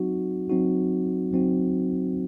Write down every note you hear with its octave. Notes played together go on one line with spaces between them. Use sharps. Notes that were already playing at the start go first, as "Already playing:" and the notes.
Already playing: F#3 C4 D#4 F#4
F#3 C4 D#4 F#4
F#3 C4 D#4 F#4